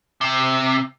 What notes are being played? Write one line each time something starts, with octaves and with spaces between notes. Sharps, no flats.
C3